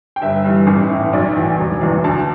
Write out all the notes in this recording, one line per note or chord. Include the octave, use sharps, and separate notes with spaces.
G5
G1 E5
G2 E3
A1
A2 E3
B1 D5
A2 E3
E1
E2 E3
D2 A5